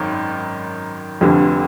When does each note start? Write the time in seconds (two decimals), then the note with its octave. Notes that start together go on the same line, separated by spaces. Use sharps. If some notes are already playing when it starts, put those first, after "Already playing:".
Already playing: G#1 F#2 D#3
1.21 F1 F2 D3 G3